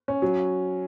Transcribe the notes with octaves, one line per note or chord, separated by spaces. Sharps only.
C#4
F#3